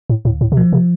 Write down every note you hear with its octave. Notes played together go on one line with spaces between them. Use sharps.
A2
D2 A2
A2
C3
B2 F3
C3